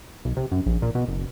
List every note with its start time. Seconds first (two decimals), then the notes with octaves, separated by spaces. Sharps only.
0.25 B1
0.37 C3
0.51 F#2
0.66 A#1
0.82 A#2
0.95 B2
1.08 F#1